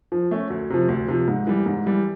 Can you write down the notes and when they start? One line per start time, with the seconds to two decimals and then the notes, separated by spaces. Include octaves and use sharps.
0.12 F3
0.31 A3 C#4
0.50 D2
0.70 C3 F3
0.89 D2
1.08 C3 F3
1.28 G#2
1.47 E3 G3
1.66 G#2
1.86 E3 G3